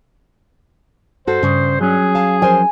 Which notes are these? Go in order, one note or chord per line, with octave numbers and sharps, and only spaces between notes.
G2 F#4 A4 C5
G2 C#3
F#3 C#4 G#4
F5 A5
F3 A#4 C5 G#5